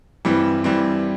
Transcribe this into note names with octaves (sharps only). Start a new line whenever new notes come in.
G2 E3 G3 C4
G2 E3 G3 C4